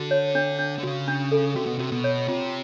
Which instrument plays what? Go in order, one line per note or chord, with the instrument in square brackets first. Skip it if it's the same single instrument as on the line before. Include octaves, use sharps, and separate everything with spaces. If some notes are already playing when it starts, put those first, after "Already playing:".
Already playing: [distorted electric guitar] D3 [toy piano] F#4
[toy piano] C#5
D4
D4
[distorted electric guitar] D3
[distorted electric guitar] C#3 [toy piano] F#4
[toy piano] D4
A4
[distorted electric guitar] C3 [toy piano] F#4
[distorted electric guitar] B2
[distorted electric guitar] C3 [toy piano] F#4
[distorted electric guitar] B2
[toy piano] C#5
[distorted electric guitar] C3 [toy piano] F4